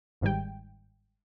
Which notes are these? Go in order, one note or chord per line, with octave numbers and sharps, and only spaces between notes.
G1 G#2 D#3 G3 G5